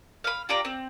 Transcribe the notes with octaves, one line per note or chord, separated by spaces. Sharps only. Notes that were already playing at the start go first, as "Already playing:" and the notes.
F5 B5
F4 G4 D5 A#5
C4